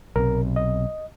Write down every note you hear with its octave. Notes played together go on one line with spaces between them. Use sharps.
B1 C3 A#4
D#5